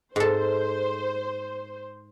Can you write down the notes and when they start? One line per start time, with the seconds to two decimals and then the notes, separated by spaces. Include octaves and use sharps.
0.16 G#2 A4 C5